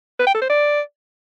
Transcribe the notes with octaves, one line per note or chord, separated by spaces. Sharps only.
B4
G5
A4
C5
D5